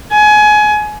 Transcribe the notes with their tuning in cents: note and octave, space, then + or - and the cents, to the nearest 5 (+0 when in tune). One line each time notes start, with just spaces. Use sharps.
G#5 +25